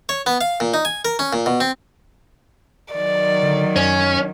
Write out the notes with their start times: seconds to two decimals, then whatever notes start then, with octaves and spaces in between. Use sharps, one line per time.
0.09 C#5
0.26 B3
0.41 F5
0.60 A#2
0.74 D#4
0.85 G#5
1.05 A#4
1.19 C#4
1.33 A#2
1.46 B2
1.60 C4
2.93 D#3 F#3 D5
3.43 D3
3.76 F#2 C#4